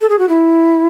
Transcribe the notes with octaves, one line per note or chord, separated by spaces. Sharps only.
A4
G#4
F#4
E4